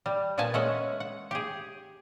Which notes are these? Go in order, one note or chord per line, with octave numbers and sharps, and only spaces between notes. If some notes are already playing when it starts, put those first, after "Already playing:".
G3
A#2 B3 B4 G#5 A5
G#3 C#4 E5 F#5
F#5
G4 G#4